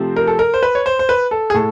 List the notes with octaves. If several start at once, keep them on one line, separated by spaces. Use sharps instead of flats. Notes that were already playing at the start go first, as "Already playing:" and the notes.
Already playing: C3 F3 A3 C4
A#4
A4
A#4
C5
B4
C#5
C5
C5
B4
A4
G#4
A2 A4